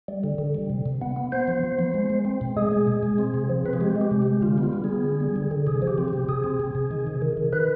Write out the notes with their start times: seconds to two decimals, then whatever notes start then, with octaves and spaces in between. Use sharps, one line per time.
0.08 G3
0.24 D3
0.38 D3
0.55 G3
0.70 C3
0.86 C3
1.02 B3
1.16 B3
1.32 B3 C5
1.48 F3
1.63 F3
1.79 B3
1.94 G#3
2.10 G#3
2.25 C4
2.41 B2
2.57 G#3 G#4
2.72 G#3
2.87 B2
3.03 G#3
3.18 C4
3.34 C3
3.49 F3
3.65 C4 B4
3.73 G#4
3.80 G#3 G4
3.96 G#3
4.01 G4
4.11 C3
4.22 G#3 G4
4.42 D3 F4
4.58 B3
4.63 F4
4.73 G3
4.84 B3 G#4
5.04 D3
5.20 G3
5.36 D3
5.51 D3
5.67 C3 G#4
5.82 F3
5.87 G4
5.98 C4
6.08 C3 G4
6.29 C3 G#4
6.44 C4
6.60 C3
6.75 C3
6.91 D#3
7.07 C3
7.22 D#3
7.37 D#3
7.53 D#3 B4